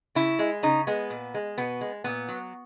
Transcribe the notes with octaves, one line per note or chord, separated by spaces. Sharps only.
C#3 E4
G#3
C#3 D#4
G#3 B3
A#2
G#3
B2 B3
G#3
A#2 B3
F#3